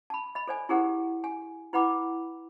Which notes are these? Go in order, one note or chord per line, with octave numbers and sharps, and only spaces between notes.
A5 B5
D#5 B5
A4 C5 D5 G#5
E4 G4 G#4 A#4 C5 F#5
G#5
E4 B4 F#5 B5 D6